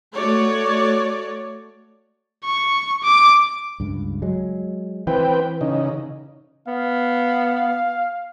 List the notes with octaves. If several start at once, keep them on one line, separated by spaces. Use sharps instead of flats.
A3 F#4 C#5 D5
C#6
D6
C#2 G2
F#3 G#3
E3 C4 B4 G5
C#3 D#4
B3 F5